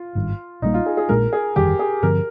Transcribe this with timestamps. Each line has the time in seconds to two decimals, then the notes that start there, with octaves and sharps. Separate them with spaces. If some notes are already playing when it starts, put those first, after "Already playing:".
Already playing: F4
0.15 G#1 G2 D#3
0.62 A#1 A#2 G3 A#3 D#4
0.74 F4
0.86 G#4
0.97 G#4
1.09 A#1 A#2 G#3 D4 A#4
1.33 G#4
1.56 G1 F2 D#3 G3 G4
1.79 G#4
2.03 G2 D3 F3 C4 A#4